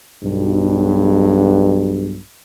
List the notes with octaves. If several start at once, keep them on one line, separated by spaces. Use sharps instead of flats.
B1 G2